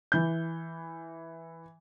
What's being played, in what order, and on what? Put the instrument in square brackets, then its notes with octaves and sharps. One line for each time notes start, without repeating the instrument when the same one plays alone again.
[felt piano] E3 G6